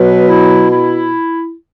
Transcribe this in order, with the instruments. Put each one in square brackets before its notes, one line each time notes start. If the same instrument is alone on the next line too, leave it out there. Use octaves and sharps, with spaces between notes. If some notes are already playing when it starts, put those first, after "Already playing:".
Already playing: [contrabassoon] B2 [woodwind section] F#3 B4
[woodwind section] E4
E4